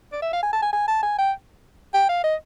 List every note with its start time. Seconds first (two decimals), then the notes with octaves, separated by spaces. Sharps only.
0.12 D5
0.22 E5
0.33 F5
0.43 G#5
0.53 A5
0.62 G#5
0.73 G#5
0.88 A5
1.03 G#5
1.18 G5
1.94 G5
2.09 F5
2.24 D#5